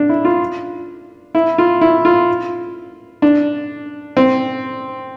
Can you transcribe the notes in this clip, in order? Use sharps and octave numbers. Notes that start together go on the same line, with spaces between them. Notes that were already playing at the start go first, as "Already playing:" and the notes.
Already playing: D4
E4
F4
E4
F4
E4
F4
D4
C4